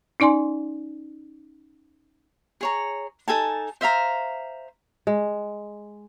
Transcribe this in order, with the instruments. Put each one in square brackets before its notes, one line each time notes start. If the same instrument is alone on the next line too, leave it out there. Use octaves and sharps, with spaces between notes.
[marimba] C#4 D#4 D5 G#5 C6
[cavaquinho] G#4 C#5 A#5
D#4 A4 G#5 A5
C5 E5 F5 A#5
[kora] G#3